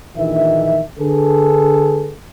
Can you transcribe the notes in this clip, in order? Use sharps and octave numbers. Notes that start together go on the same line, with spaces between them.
A#1 D#3 E3 E5
D3 G#4 A4 B4